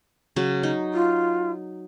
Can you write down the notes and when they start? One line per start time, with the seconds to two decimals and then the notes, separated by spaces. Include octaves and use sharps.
0.36 C#3 F#3
0.63 D#4
0.93 F4